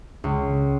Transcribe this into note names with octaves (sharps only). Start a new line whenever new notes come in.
C#2